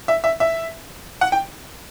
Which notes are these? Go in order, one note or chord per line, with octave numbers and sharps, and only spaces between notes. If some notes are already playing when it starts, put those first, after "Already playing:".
E5
E5
E5
F#5
G5